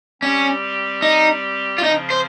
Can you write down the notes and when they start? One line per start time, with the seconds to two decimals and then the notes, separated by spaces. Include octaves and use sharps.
0.22 G3 C4 C#4 G4
1.02 D#4
1.78 F4
1.83 C#3 F3 C4 D#4
2.10 C5